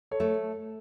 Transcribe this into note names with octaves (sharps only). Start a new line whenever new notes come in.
A4 C#5
A3